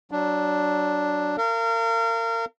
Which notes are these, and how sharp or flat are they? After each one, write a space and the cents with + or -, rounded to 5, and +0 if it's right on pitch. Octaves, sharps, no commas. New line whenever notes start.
F#3 +20 D4 +0
A#4 -30 F5 -35